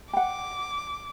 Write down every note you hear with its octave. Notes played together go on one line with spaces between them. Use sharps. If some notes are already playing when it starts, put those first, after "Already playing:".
F#5 G5 D6